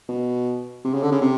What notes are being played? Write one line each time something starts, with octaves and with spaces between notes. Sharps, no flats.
B2
C3
C#3
D3
C#3
C3